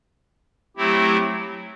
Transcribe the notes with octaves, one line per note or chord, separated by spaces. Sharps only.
F#3 A3 C4 E4 G4